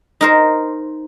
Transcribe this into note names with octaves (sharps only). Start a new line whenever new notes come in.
D#4 A#4 C5